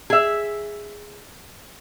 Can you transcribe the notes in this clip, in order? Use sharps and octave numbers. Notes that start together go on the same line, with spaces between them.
G#4 E5